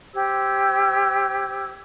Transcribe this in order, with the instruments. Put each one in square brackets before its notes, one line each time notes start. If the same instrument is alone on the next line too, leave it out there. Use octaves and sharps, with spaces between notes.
[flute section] G4 C5 E6 G#6